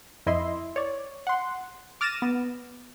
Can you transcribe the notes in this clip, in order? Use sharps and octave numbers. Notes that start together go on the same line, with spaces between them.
F2 E4 D#5 E5 C6
C#5 D5
F#5 C6
D6 F6 A6 A#6 D#7 E7
B3